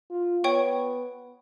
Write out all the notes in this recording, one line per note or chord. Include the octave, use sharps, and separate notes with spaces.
F4
B3 C#5 G5 C#6